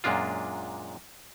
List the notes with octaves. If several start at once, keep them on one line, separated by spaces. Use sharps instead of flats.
F#2 A#2 G#3 D4 F4